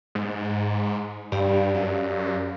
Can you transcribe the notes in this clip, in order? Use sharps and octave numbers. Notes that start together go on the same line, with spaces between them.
G#2
G2 G4 D5 F5
F#2